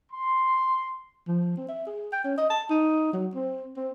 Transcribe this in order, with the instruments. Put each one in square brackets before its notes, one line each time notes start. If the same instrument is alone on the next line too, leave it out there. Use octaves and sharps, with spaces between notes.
[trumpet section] C6
[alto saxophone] F3
C4
E5
G#4
G5
C#4
D#5
A5
D#4
F#3
C4
C4